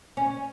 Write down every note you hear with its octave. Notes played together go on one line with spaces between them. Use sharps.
C#4